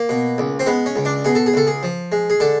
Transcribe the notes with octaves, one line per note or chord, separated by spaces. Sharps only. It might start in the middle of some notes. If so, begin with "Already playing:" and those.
Already playing: A#3
B2
C#2
C4
G#3 B3
C#4
C#2
D4
B2 G#4
A4
G#4
C#2 A4
G#4
F3
G#3
G#4
D3 A4